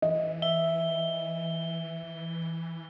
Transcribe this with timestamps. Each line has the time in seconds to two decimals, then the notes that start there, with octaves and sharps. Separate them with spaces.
0.02 E3 D#5
0.42 E5 G7